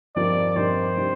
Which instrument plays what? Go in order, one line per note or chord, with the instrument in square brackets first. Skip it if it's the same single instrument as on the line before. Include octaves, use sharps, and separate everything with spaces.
[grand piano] G2 F3 C4 D#4 A#4 [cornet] D5
[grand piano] G2 F3 C4 D#4 A#4 [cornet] C5
[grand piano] C3 G3 D4 G4